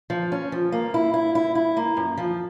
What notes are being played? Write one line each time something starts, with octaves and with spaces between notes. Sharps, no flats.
F3
C#4
F3
A#3
E4
E4
E4
E4
A#3
F#2
F3